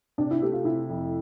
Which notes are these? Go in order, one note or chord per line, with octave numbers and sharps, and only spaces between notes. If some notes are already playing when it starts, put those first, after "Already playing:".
C3 D4
E4
A3 G4
F4
C3 E4
F2